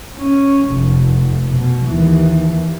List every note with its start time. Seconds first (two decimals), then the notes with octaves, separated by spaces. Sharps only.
0.17 C#4
0.70 F1
1.50 B2
1.86 D#2 E3